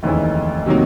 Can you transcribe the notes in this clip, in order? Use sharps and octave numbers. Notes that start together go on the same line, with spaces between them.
F1 D#2 C#3 E3
C3 D#3 F#3 A#3